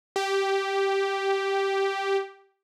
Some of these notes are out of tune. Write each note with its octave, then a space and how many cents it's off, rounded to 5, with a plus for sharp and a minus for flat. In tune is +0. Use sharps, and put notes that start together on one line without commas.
G4 -5